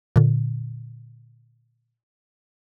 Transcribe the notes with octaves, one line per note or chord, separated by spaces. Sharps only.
A#2 D3